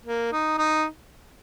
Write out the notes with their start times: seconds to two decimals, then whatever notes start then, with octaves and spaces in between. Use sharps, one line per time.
0.06 A#3
0.32 D#4
0.58 D#4